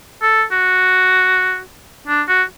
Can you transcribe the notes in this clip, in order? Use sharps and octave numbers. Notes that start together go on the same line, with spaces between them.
A4
F#4
D4
F#4